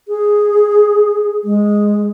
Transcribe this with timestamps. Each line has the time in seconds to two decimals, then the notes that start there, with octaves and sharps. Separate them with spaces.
0.08 G#4
1.44 G#3